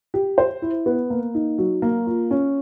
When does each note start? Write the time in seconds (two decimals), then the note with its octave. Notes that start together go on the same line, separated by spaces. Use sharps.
0.14 G4
0.38 C5
0.62 E4
0.86 B3
1.10 A#3
1.34 D#4
1.58 F#3
1.82 A#3
2.06 F4
2.31 C#4